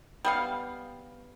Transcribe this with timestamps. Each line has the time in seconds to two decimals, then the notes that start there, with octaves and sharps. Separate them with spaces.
0.25 G3 B3 F5